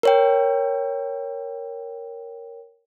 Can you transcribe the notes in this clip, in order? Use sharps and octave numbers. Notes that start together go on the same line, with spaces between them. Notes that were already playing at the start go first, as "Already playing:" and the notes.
A#4 C#5 G5